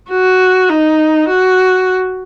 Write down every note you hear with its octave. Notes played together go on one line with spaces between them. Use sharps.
F#4
D#4
F#4